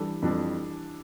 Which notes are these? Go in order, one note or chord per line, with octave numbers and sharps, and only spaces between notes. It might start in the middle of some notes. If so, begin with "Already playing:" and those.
Already playing: E3 G3 D4 A4
F2 E3 G3 D4 A4